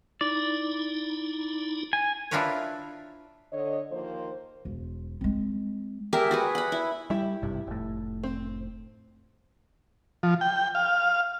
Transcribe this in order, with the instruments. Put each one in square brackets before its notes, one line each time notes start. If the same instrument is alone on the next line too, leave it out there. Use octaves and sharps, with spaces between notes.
[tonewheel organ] D#4 E4 [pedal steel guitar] D5
[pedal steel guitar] G#5
[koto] D4 E4 F4 A#4 B4 C#5
[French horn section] D3 C#5 D#5
D#2 F3 A#3 C5
[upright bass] E1
G#3 C4
[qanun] G4 G#4 A#4 E5
F#4 G#4 B4
F#5 B5
E4
[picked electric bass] G3 [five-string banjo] E4 G4
[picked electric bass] G#1 G2 C3
F1 A2
[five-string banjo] C4
[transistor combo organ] F3
G5
F5